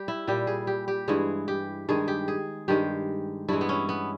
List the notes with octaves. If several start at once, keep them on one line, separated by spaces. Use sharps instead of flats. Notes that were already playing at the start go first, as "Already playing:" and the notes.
Already playing: G3 G4
E4
A#2 G3 G4
G#4
G4
G4
G2 E3 G#3 G#4
G4
G2 D#3 G#3 G#4
G4
G#4
G2 D#3 G#3 G4
G2 E3 G#3 E4
B3
C#4
B3